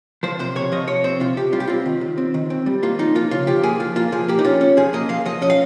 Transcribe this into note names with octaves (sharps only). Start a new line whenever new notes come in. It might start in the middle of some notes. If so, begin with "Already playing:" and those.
F3 C5
C3 C5
C3 C#5
F3 D#5
C3 C#5
C4 C5
C3 F4
C3 G4
G3 F4
G4
C4 F4
D#3
D#3
C4
D#3
C4
G3
A#3 F4
F3 D#4
A#3 F4
C#3 F4
F3 G4
A#3 G#4
F3 F4
A#3 F4
F3 G#4
A#3 G4
D#4
C#4 F4
C#4
F3 G#4
A#3 D#5
F3 F5
F3 D#5
C#4 D#5
F5